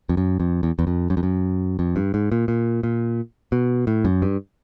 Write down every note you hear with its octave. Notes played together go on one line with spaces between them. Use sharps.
F2
F#2
F2
E2
E2
F2
F#2
F2
F#2
F2
G2
G#2
A#2
A#2
A#2
B2
A2
F#2
G2